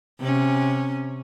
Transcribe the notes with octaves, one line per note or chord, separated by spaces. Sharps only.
C3 C#4